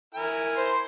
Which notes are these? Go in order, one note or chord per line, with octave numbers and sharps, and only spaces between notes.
E4 A#4 G#5
C5